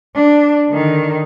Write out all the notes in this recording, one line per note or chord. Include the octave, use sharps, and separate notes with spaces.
D4
D3 D#3